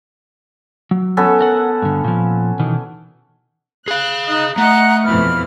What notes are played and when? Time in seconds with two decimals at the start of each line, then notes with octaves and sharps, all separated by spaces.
0.91 F#3
1.17 B3 C#4 A4
1.41 A#4 F#5
1.82 G2 D3
2.04 A#2 F3
2.59 B2 D#3 E3
3.88 G#4 F5 F#6
4.28 D#4 D#5 F#6
4.58 A3 D#5 F#5 A#5 F#6
5.04 F2 B2 E3 B5 F6